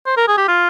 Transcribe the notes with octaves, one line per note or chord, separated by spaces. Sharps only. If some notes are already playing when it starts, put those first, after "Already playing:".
C5
A#4
G#4
G4
F4